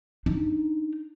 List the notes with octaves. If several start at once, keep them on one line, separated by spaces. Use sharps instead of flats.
D4 D#4